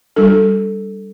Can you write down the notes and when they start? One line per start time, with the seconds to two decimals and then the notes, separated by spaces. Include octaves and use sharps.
0.16 G3 D4 A4